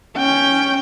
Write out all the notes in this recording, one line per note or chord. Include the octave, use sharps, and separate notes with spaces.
C#4 G5